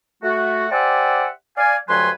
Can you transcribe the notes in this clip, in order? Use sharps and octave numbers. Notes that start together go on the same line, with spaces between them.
A3 F#4
G4 C5 D5 E5 F#5 G#5
D5 F5 G#5
D2 G2 F#3 B4 G#5 C6